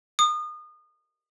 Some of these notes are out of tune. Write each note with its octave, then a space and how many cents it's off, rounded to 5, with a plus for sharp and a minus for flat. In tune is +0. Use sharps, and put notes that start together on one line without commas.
D#6 -30